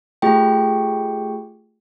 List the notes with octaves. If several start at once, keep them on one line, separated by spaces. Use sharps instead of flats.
A3 F4 G4 G#4 G5